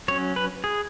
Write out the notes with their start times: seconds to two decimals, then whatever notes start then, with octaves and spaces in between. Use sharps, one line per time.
0.08 F#3 C#4 C#5
0.36 B4
0.64 G#4